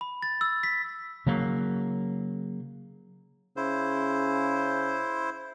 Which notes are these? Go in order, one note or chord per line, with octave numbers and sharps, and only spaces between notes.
B5
A6
E6
B6
C#3 F#3 A#3
C#3 E4 C5